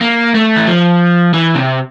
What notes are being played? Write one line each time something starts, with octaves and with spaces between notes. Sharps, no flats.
A#3
A3
E3
F3
E3
C3